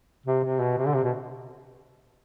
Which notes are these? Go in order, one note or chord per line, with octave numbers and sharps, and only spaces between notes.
C3
C3
B2
C3
D3
C3
B2